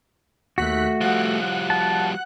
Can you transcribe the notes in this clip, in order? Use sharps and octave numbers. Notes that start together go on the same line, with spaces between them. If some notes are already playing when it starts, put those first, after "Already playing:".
D#2 A3 F#4 F#6 B6
F3 G3 F#5 F#6
A5